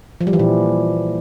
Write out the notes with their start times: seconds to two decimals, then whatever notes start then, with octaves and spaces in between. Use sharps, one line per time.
0.21 F3
0.27 G3
0.33 E3
0.39 A#2